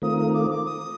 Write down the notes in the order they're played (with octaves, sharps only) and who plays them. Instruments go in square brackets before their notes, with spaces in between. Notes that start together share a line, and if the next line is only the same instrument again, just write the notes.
[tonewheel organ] D#3 A3 C4 F4 A#4 [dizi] D#6
[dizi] D#6
D6
D6
D#6